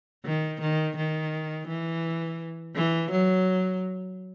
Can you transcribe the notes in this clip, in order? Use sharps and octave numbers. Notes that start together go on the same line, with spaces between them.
D#3
D#3
D#3
E3
E3
F#3